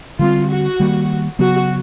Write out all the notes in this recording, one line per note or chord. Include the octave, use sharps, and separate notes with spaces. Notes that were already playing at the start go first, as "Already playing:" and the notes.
D3 G3 C4 F4
F#4
D#3 G3 A#3
C#3 F#3 B3 F#4